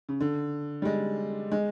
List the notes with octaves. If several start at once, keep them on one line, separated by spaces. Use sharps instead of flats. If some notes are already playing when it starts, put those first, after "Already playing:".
C#3
D3
G3
G#3
G#3